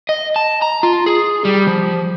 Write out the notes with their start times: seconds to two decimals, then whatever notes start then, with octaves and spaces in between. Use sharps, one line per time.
0.09 D#5
0.36 A5
0.62 A#5
0.83 F4
1.06 G#4
1.45 G3
1.67 F3